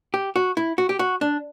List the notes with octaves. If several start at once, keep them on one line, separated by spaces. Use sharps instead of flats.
G4
F#4
E4
F#4
G4
F#4
D4